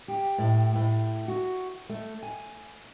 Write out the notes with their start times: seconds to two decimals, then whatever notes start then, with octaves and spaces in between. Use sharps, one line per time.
0.08 G4
0.38 A2
0.75 A2
1.28 F#4
1.89 A3
2.23 G#5